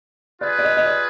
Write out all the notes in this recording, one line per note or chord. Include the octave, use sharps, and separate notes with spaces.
F4 G#4 B4 D5
D5
D#5
D#5
D5